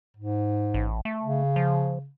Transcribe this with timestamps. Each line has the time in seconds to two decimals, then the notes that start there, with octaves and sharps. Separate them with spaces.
0.17 G#2
0.74 A1
1.05 A3
1.23 C#3
1.56 F3